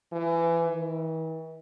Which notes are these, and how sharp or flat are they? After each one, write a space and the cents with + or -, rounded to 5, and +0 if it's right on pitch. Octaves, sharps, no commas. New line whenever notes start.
E3 +25
E3 -40